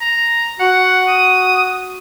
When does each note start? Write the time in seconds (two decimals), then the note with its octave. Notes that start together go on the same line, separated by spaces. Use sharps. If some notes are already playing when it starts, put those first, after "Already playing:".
0.01 A#5
0.60 F#4 F#5
1.08 D#6